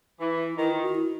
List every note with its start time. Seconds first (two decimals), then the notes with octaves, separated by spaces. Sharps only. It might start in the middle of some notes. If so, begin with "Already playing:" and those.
0.20 E3 E4
0.58 D#3 E4
0.71 F4
0.82 F#4
0.95 E4